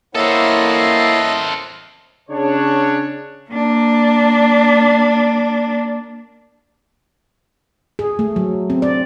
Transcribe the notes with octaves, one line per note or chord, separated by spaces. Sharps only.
A#3 E4 A4 C5 C#5 D#5 E5 F#5
C#3 D4 C#5
A#3 D4
G#4
A3
F#3
C4
D5